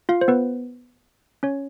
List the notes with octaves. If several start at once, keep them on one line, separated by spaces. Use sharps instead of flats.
F4 F5
C5
B3 B4
C#4 C#5